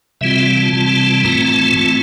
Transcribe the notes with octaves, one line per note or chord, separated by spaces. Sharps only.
C3 E3 G3 C4 F4 E5
F5
A5
C3 E3 G3 C4 F4
A2 E3 A3 C4 F4 A#5
A#5
A5
A2 E3 A3 C4 F4 A5